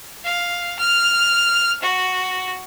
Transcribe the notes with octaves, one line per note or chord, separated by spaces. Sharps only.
F5
F6
F#4